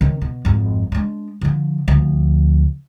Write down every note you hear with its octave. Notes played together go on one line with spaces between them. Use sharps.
D#3 C#4
B2
G#1 F2
G#3 D4
D3 F3
D2 F3